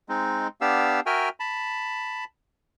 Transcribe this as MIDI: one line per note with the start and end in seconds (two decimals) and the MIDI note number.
0.09 0.48 56
0.09 0.48 60
0.09 0.48 63
0.61 1.00 59
0.61 1.00 62
0.61 1.00 67
0.61 1.00 77
0.61 1.00 88
1.06 1.29 66
1.06 1.29 70
1.06 1.29 76
1.06 1.29 79
1.06 1.29 80
1.06 1.29 89
1.40 2.24 81
1.40 2.24 83